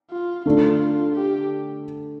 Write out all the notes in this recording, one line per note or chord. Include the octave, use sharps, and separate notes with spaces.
F4
D3 A3 D4 F4
G4